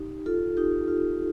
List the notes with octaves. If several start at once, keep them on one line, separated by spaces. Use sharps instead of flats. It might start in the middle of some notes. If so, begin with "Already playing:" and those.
Already playing: D#4 G4
F4 A4
D#4 G4
F4